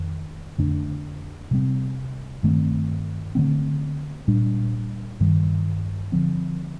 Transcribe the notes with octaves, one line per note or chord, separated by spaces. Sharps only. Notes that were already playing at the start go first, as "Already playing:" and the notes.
Already playing: F2 D#3
F2 D3 A3 D4
C3 G3 C4
G2 D#3 A3 C4
D3 F3 A3 C4
A#2 G3 D4
G2 D#3 G3
D3 F3 C4